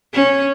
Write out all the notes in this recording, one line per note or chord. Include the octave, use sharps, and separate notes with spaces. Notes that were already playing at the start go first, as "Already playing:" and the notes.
C#4